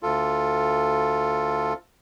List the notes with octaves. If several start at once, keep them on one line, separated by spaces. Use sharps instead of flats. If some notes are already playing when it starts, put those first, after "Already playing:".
D2 F4 A4